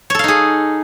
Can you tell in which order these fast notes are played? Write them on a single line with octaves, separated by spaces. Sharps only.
C#5 A4 F5 D#4 G#4